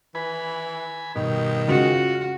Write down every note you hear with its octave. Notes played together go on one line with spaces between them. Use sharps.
E3 G#5 B5
G2 B2 D#3
C#3 G#3 F4 F#4